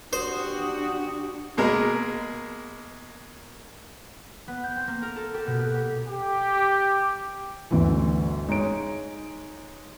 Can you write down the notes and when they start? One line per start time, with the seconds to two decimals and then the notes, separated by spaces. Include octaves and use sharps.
0.13 D4 F#4 G4 C5 D#6
1.57 B2 G#3 A#3 A#4
4.48 B3
4.64 G6
4.76 C4
4.87 A#3
5.02 A#4
5.16 A4
5.34 G4
5.47 B2
5.59 B3
5.74 G4
6.08 G4
7.71 G1 D2 E3
8.48 G#3 D#4 C#5 D7